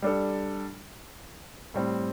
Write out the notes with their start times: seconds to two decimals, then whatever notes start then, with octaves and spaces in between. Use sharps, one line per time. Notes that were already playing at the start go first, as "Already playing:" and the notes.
0.02 G3 D4 A4
1.74 A2 G3 C4